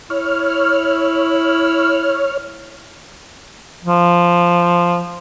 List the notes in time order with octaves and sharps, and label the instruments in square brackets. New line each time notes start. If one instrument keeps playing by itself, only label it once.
[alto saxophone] E4 [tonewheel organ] C#5 F6
[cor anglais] F3